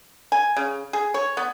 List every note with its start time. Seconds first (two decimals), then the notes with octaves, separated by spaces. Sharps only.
0.32 G#5
0.57 C#3
0.93 G#4
1.14 C#5
1.37 B3